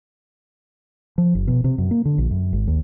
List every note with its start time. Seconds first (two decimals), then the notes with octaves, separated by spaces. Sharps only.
1.18 F3
1.35 F#1
1.48 B2
1.64 C3
1.78 F#2
1.91 A#3
2.05 D3
2.18 A#1
2.31 F#2
2.53 G#1
2.67 D#2